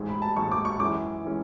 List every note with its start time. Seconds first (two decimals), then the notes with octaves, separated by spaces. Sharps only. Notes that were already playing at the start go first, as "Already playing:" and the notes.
Already playing: A1 G#2 G#3
0.09 B5
0.22 A5
0.36 A1 G#2 G#3 C#6
0.52 D6
0.65 C#6
0.80 F#2 E3 G#3 C#4 D6
1.24 E3 G#3 C#4